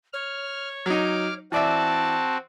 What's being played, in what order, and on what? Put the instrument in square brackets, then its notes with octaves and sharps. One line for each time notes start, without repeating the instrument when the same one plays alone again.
[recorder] C#5 [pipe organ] F6
[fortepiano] F#3 D#4 [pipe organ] D6 F6
[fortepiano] E3 D5 E5 [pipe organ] C4 F#4 [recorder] A5